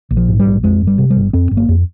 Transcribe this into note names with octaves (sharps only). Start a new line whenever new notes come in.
A#1
F3
G#2
G3
A#1
F2 G#3
G1
G3
C3
G3
G1
F2 C4
G1
A#3
F2